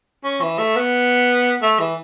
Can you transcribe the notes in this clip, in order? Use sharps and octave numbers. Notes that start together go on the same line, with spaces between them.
C#4
E3
A3
B3
A3
E3